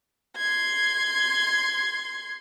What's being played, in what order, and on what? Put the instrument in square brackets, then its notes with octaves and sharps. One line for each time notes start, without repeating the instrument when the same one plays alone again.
[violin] C6 G#6